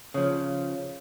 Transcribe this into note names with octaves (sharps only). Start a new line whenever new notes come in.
C#3 F3